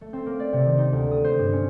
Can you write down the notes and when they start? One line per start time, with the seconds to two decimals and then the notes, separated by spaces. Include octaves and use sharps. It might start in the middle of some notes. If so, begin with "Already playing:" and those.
0.01 A3
0.13 C4
0.26 A#3
0.40 D5
0.53 C3
0.66 D#3
0.78 D#4
0.93 D2
1.11 D#6
1.24 C5
1.39 G2
1.53 C#4